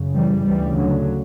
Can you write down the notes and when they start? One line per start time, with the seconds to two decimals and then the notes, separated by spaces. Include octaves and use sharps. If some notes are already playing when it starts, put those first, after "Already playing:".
Already playing: F#2 C#3
0.14 E3 G3
0.45 D2 C#3 E3 G3
0.77 D3 F#3